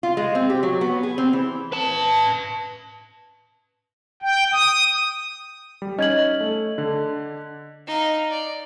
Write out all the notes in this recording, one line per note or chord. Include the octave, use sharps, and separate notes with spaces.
F4
G#3
C4
G4
F#3
B3
G#4
C4
E3
B4 A5
G5
D#6
G3
C#4 D#4 D#5 G#6 F#7
A3
D3
D#4 F5
D5